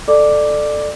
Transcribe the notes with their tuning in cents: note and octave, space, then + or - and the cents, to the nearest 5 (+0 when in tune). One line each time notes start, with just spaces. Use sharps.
A4 +0 D5 +20 D6 +0